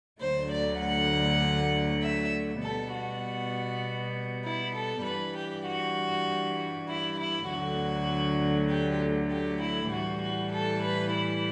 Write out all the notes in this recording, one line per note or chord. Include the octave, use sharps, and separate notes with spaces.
D2 D3 F#3 A3 C5
D5
F#5
E5
B2 G3 B3 A4
F#4
E4
A4
G2 E3 G3 B4
G4
F#4
E4
E4
D2 D3 F#3 A3 F#4
G4
G4
E4
A2 E3 G3 F#4
F#4
A4
B4
E4